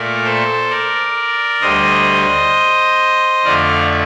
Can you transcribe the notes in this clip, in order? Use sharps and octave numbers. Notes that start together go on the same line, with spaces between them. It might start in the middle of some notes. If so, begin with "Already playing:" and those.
Already playing: A#2 A3 A#4 D5
A4 C5
A#4 D5
D2 D3 G3 C5 D#5
F2 D3 A3 D5 F5